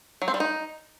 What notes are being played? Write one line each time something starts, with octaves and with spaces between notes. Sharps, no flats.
F#3
C4
G3
D#4